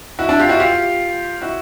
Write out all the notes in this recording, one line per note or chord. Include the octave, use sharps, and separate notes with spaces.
E4 F#4
D4 E4
F4 G4
E4 F#4
F4 G4
E4 F#4